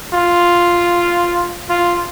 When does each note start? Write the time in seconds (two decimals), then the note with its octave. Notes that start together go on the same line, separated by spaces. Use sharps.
0.13 F4
1.69 F4